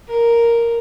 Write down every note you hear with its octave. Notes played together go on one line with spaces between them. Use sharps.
A#4